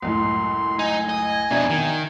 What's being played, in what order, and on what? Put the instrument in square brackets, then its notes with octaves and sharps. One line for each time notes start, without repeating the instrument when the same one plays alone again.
[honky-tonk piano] C#2 F#2 A2 [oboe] C6
[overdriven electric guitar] D#4 [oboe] G#5
[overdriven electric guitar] D#5
[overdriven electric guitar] F2 B2 [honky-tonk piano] D4 E5 A#5
[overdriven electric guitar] D#3